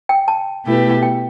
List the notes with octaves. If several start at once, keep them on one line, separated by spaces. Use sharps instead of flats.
G5
A5
B2 A3 E4 G4 B4
G5